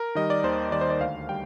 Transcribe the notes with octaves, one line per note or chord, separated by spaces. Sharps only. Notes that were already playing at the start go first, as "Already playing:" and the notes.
Already playing: A#4
D#3 G3 D#5
D5
D#2 C5
D#3 G3 D5
C5
D5
D2 F5
G3 G5